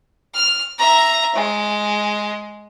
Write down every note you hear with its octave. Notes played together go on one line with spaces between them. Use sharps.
F6
E5 A#5
G#3